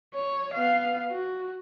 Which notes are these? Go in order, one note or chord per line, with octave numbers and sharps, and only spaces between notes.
C#5
B3 F5
F#4